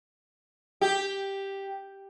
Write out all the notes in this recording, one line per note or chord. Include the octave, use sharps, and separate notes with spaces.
G4